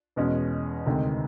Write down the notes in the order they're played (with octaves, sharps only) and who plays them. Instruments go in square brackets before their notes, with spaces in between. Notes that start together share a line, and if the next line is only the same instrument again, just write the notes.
[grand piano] E2 B2 G#3 C#4
D2 C3 D#3 G#3